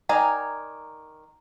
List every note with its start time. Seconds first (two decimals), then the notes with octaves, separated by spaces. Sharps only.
0.09 D#3 D5 G#5 A#5